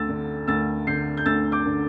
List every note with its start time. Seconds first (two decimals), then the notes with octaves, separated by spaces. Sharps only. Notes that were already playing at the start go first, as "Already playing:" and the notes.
Already playing: D2 E6 A6
0.09 D3
0.47 D2 E6 A6
0.87 D3 G6 C7
1.17 G6
1.26 D2 E6 A6
1.52 D6 G6
1.66 D3